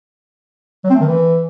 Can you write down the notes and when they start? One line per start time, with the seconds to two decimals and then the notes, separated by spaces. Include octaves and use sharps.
0.84 F#3
0.89 C4
0.95 A3
1.00 D#3
1.06 E3